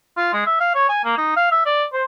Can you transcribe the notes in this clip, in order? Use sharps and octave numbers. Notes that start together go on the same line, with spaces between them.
F4
G#3
E5
F5
C#5
G#5
A#3
D#4
F5
E5
D5
C5